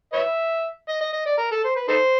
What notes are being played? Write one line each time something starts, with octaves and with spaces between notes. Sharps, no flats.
B4 C#5 E5
D#5
D#5
D#5
D5
A#4
A4
C5
B4
D#4 A4 C5